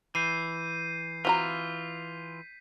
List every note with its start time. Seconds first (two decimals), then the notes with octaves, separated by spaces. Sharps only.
0.15 E3 G6 C7 D#7
1.25 E3 C4 F4 F#4 A#5 B6